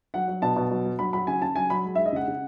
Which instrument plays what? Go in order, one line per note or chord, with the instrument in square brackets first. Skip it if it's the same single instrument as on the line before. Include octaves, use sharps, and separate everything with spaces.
[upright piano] F#3 F#5
F#3
B2 A5
B2
F#3
F#3
F#3 B5
F#3 B5
C#3 G#5
C#3 A5
F#3 G#5
F#3 B5
G#3
G#3 E5
D#5
C#3 F#5
C#3